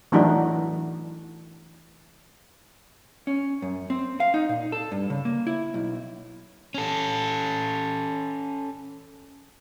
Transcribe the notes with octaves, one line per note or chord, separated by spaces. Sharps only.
E3 F#3 A3 D4 D#4 F#4
C#4
F#2
C4
F5
D#4
A#2
A4
G2
C#3
A#3
E4
B1
C#4 A4